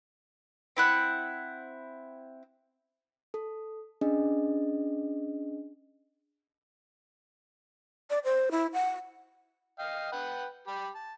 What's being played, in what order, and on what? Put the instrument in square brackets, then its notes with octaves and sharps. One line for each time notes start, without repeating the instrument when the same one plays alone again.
[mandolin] C4 E4 F#5
[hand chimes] A4
C#4 D4 G#4 D#5
[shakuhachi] D5
C5
E4
F#5
[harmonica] D#5 F5 G5
B4 F#5 G5
G4 B5
A5